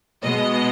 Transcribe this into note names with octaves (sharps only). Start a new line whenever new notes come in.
B2 G#3 B3 D#5